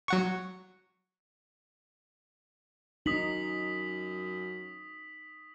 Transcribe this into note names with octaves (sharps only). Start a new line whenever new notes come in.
F#3 F#5 C#6
F#2 D#4 D#6 B6 F#7